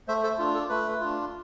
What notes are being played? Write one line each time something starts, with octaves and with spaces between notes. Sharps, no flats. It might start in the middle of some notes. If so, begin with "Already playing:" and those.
A3 C5 E5
A4 C5
D4 F4
A4
A3 B4
D4 F4